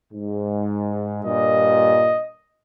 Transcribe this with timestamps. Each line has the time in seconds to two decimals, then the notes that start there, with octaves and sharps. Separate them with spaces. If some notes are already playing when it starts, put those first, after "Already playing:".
0.13 G#2
1.25 G2 A#2 D#5